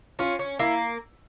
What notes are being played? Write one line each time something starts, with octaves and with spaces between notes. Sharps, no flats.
C#4 F4
C#4
A#3 E4